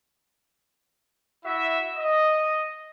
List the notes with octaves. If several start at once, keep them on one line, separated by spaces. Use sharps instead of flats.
E4 F#4 E5
D#5